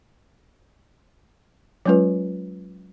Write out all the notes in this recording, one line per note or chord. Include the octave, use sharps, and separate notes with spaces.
F#3 G#3 C#4 F4 B4